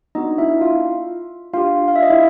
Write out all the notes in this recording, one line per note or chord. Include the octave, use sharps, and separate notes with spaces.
B3 D4 D#4 F#4 D#5
E4 E5
F4 F5
D4 F4 G4 F5
F5
E5
D#5
E4 E5